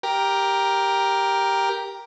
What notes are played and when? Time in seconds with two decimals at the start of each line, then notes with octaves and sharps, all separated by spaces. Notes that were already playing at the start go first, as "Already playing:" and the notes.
0.03 G4 A#4